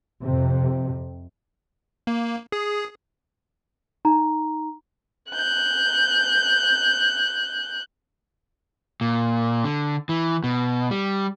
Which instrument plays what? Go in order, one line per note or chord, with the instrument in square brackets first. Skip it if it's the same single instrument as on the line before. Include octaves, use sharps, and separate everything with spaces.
[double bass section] F2 C3
[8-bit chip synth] A#3
G#4
[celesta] D#4 A#5
[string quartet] F#6 G6
[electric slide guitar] A#2
D3
E3
B2
G3